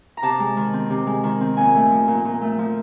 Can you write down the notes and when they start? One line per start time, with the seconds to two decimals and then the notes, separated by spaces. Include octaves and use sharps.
0.17 A#5
0.22 C3 A5
0.39 G#3
0.57 D#3
0.73 C4
0.90 C3
1.07 G#3
1.23 D#3
1.41 C4
1.57 A#2 G#5
1.75 A3
1.91 F3
2.08 A#2
2.25 A#2
2.41 A3
2.59 F3